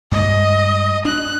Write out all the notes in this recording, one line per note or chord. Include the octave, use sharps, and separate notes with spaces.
G2 G#3 D#5
D4 F#6